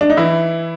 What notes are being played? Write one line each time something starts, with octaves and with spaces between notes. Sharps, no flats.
D4
D#4
E3 E4